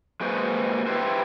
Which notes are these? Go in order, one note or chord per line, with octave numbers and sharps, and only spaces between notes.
G#3 A#3 F#4 B4 C5 D#5
E4 G4 B4 C5